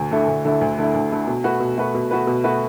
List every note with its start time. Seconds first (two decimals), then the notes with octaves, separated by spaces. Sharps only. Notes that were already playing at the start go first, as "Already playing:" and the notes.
Already playing: D2
0.11 D3 A3 E4
0.27 D2
0.45 D3 A3 E4
0.61 D2
0.78 D3 A3 E4
0.95 D2
1.11 D3 A3 E4
1.27 B2
1.44 A3 F#4 B4
1.60 B2
1.77 A3 F#4 B4
1.94 B2
2.11 A3 F#4 B4
2.27 B2
2.44 A3 F#4 B4